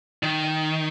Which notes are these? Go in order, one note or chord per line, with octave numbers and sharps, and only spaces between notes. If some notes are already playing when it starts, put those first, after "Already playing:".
D#3